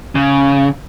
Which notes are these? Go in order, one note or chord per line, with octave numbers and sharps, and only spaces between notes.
C#3